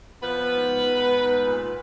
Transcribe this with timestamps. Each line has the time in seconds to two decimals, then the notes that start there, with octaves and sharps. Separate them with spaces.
0.22 F3 B3 B4
0.53 G#2
0.83 G#2
1.13 G#2
1.43 A#2